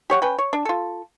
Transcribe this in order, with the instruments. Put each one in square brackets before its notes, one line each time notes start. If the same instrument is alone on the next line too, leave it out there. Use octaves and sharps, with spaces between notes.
[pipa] G4 C#5 F#5
C#4 B4 G5
C#5
D4
F4 A4